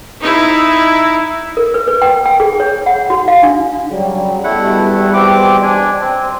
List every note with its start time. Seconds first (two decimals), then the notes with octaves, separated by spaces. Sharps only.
0.21 D#4 E4
1.57 A#4
1.74 B4
1.88 B4
2.02 G5
2.25 G5
2.40 G#4
2.60 C#5
2.86 F#5
3.10 F#4
3.28 F5
3.43 D4
3.90 C#3 F#3 G3
4.44 E2 B2 G3 A3 E4 F#5
5.14 C4 G4 D6
5.63 D4 G#5
6.01 C4